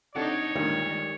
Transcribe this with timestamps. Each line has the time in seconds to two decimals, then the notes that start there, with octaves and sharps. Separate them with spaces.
0.15 C3 D4 D#4 A4 C#5 F#5
0.55 D2 G2 A#2 D#3 G3 G#3